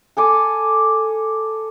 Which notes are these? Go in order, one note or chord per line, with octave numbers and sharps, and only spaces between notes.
A4 G#5 D6